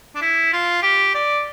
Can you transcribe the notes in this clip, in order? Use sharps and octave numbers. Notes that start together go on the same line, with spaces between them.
D4
E4
F4
G4
D5